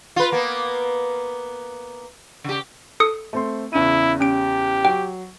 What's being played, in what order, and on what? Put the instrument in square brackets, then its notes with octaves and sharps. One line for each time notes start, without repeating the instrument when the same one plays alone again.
[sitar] F4 B4
A#3 B3
C#3 G4
[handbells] A4 D#6 C#7
[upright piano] A3 C4 C6
[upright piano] E2 C#3 D#7 [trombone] E4
[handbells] C#4 D7 [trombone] G4
[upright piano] F#3 [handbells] G5